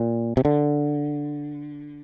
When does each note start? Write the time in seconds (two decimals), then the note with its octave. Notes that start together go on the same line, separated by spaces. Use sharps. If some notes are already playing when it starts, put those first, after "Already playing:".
Already playing: A#2
0.37 C3
0.45 D3